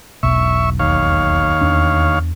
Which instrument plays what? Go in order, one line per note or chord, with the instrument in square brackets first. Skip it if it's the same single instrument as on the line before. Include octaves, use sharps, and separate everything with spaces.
[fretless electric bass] E1 B1 [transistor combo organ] E5 C#6
[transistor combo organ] D#2 C#5 F5
[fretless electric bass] E2 D4